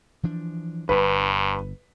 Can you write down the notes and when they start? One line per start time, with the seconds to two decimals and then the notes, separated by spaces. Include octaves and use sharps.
0.23 E3 F3 D4
0.89 G1 G2 B4